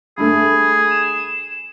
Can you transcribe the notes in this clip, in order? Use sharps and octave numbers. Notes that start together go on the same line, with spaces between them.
G2 A3 G#4 B5
E7